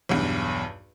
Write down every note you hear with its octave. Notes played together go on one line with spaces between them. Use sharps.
B1 E2 G2